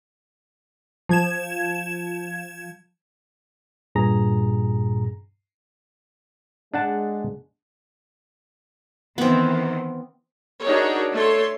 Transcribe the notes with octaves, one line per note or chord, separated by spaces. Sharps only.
F3 G#6 E7
G2 A#2 G#4 A#5 A#6
G#3 D4 F#5 A5
D#3 E3 B3 C4
D4 D#4 F#4 G#4 A#4 C#5
A3 A4 C#5 C6